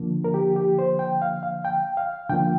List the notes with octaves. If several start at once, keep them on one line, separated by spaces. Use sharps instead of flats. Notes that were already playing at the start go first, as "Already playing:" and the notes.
Already playing: D3 F3 A#3
A#4
G4
G4
C5
G5
F5
F5
G5
F5
D3 F3 A#3 G5